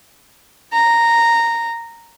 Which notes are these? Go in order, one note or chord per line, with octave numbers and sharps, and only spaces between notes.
A#5